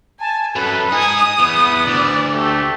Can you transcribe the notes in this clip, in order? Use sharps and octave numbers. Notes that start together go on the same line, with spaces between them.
G#5 A5
F#2 A4 B4
D#4 G#4 G#5 D#6
E2 B3
D2 D5
A3 G4